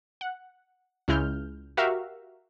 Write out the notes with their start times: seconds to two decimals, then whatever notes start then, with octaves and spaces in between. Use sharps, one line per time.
0.21 F#5
1.08 C#2 G#3 E4 F6 G6
1.77 F#4 G4 A#4 E5 F5